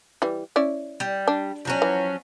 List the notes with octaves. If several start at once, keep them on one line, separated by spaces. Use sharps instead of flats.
E3 G3
C#4 E4 D5
G3
D4
F3 F#3 C#4
E3